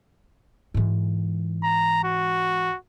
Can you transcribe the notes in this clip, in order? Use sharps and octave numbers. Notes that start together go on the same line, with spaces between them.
G#2 E3
A#5
F#4